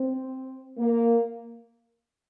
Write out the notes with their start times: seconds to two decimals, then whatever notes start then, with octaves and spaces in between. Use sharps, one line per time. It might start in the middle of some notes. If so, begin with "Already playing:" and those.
Already playing: C4
0.78 A#3